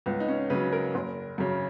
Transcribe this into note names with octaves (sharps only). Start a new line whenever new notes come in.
C#2 B3
D#4
C#4
C#3 F#3 B4
A#4
F#1
F#2 C#3